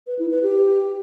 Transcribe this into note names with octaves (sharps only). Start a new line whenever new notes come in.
B4
E4
B4
G4